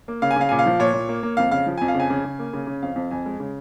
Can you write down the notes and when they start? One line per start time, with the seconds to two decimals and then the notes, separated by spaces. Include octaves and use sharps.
0.08 A#3
0.22 C#3 F5
0.31 G#5
0.36 C#3 F5
0.49 A#2 G#5
0.59 F5
0.66 F3
0.80 A#2 C#5
0.94 A#2
1.09 A#3
1.23 A#3
1.37 F2 F5
1.51 C#3 F5
1.66 F3
1.78 F2 G#5
1.88 F5
1.95 C#3
2.00 G#5
2.10 C#3
2.25 C#3
2.39 A#3
2.53 C#3
2.67 C#3
2.82 F2 F5
2.96 F2
3.11 F2 G#5
3.26 G#3
3.40 C#3